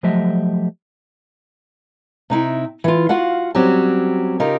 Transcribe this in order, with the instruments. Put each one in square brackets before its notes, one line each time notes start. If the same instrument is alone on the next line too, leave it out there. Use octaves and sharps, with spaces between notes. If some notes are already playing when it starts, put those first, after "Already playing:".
[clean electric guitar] F3 F#3 A3 G4 D#5 E5
[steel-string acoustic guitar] C3 D#4 E4 G5
E3 F4
F4 F#4 F5 F#5
F#3 G3 C4 C#4 F#4 G4
C#3 D#4 F4 G4 A#4